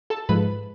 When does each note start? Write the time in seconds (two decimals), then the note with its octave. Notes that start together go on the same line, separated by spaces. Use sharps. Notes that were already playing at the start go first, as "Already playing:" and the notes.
0.10 A4 A5
0.29 G#2 F3 G#3 B4 B5